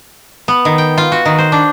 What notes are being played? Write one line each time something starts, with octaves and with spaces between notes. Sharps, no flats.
B3
D#3
G5
F4
F#4
D#3
C5
D4